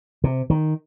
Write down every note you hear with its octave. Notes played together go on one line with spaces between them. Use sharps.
C3
D#3